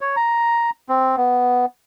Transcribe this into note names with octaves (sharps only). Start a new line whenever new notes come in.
C#5
A#5
C4
B3